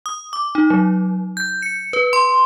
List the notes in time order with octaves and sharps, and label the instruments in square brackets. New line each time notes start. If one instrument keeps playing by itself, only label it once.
[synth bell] D#6
D6
D#4
F#3
G6
C#7
B4
C6